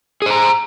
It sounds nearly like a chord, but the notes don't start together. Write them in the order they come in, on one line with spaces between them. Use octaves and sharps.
G#4 C5 A#5